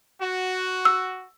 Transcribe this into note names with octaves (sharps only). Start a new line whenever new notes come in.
F#4
E6